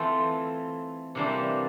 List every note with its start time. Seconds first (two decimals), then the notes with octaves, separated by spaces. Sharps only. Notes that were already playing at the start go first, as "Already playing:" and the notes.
Already playing: E3 A3 C4 F4
1.15 C3 E3 G3 A#3 D4